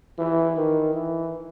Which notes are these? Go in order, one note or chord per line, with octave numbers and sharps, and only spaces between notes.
E3
D#3
E3